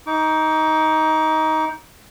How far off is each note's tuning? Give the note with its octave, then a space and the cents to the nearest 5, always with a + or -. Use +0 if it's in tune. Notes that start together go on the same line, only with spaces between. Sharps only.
D#4 +15 D6 -35